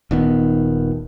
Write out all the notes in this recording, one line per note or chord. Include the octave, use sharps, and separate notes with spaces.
D#1 D#3 B3